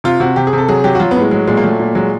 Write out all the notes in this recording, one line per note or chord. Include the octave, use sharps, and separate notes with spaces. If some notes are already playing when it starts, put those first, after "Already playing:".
C3 F4
C3 F#4
C3 G4
G#4
C3
A4
F#3 G#4
F#3 G4
F#4
F#3 F4
B3
A2 G#3
F#3 G#3
A#2 G#3
A#3
F#3 A3
A#2
F#3 G#3